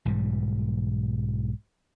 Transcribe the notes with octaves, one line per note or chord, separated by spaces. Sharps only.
B1 G#2 E3 G3